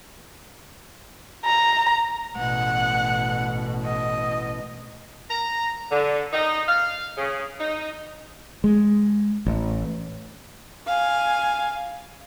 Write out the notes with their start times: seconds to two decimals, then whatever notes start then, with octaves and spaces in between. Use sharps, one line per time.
1.45 A#5
2.37 A1 B2 F#5
3.85 D#5
5.29 A#5
5.90 D3
6.32 D#4
6.68 F5
7.17 C#3
7.59 D#4
8.64 G#3
9.46 A1
10.86 F5 G#5